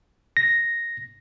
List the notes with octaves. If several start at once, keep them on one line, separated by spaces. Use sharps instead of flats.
A#6